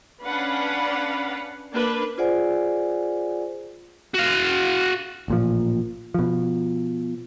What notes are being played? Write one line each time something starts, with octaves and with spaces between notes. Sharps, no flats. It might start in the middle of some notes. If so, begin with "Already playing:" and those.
C#4 D4 B4 F5 F#5 B5
A#3 D4 B4
F4 G#4 C5 D5 F#5 G#5
F#4 F5
A1 A#2 F3
B2 F3